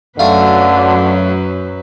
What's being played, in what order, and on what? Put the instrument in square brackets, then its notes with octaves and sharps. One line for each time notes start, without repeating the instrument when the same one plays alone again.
[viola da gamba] F#2 F#3 B4 [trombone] D3 [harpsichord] A3 F5